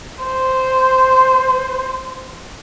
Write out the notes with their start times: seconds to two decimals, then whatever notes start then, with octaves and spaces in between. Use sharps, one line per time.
0.24 C5